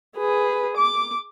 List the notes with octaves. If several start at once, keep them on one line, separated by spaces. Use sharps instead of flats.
G#4 B4
D6